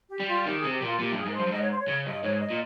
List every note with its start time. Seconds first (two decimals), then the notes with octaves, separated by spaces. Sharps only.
0.10 G4
0.20 G3
0.28 F4
0.46 D#3 G4
0.59 C3 G#4
0.73 G4
0.82 A#2 F4
0.99 A#2 G4
1.12 G2 G#4
1.26 G#2 A#4
1.35 G2 C5
1.47 G2
1.52 G#2 D#5
1.62 C#5
1.70 C5
1.80 C#5
1.88 C#3
2.06 G2 D#5
2.23 G#2 C#5
2.41 D#5
2.51 A#2